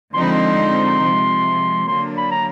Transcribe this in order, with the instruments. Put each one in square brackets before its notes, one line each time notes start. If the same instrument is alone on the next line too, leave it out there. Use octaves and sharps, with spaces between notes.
[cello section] D3 F3 G#3 C4 D#4 [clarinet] C6
[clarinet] B5
C6
[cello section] C3 F3 G#3
[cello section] D3 F#3 A#3 D4 [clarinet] C6
[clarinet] B5
A#5